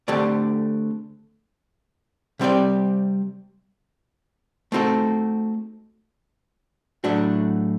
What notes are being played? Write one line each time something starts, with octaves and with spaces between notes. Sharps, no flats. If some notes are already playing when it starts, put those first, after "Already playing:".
D3 A3 C4 G4 D5
C3 G3 C4 G4 D5
A3 C4 D#4 F#4 A4
A2 F#3 A3 D4 F#4